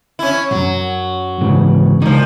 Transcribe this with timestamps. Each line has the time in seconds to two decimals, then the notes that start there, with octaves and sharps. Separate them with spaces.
0.19 C#4 E4
0.51 B1 F#2 F#3
1.41 G#2 C#3 E3
2.02 C#2 A#2 F3 D#4